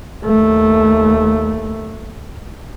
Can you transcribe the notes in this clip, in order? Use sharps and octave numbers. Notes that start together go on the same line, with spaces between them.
D#2 A3